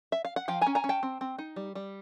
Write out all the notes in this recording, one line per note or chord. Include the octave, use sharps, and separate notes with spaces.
E5
F5
F#5
F3 F5 G5
G#5 A#5
C#4
G#5 A#5
C#4
G5 A5
C4
C4
D#4
G3
G3